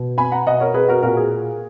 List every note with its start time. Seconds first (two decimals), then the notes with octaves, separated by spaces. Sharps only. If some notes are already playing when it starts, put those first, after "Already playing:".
Already playing: B2
0.18 G#5 B5
0.32 F#5 A#5
0.47 B2 D#5 F#5
0.60 A#4 C#5
0.74 G#4 B4
0.88 F#4 A#4
1.03 A#2 F#4 A#4
1.17 G#4